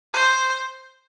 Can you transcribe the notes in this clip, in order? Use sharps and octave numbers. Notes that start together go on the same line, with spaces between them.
C5